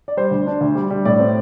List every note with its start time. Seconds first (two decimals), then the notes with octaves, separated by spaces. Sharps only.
0.08 D5
0.17 G3 C5
0.31 D2
0.47 D4
0.61 D2
0.75 G3
0.90 G3
1.05 A2 D5
1.20 C4